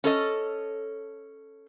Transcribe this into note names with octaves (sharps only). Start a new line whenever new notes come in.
C#4 A4 D#5